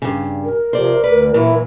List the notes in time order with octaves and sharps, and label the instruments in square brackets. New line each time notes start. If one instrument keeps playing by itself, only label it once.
[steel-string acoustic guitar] G2 C#3
[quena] A#4
[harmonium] C3 F3 [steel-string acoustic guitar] C5 D5
[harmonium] D2 [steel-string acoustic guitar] B4 D5
[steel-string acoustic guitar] A#2 E3 F#3 [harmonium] E4